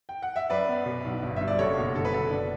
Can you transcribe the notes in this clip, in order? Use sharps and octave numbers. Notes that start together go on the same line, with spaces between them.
G5
F#5
E5
F#2 B4 D5
B3
B2
B1
G1
G2 E5
D5
F#1 A4 C#5
B2
D3 A4
B4
F#1 A4
D4